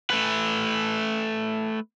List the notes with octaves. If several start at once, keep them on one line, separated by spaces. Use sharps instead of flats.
A3 B4